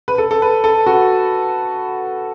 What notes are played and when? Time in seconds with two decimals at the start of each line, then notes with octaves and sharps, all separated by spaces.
0.08 B4
0.18 A4
0.31 A4
0.42 B4
0.64 A4
0.87 F#4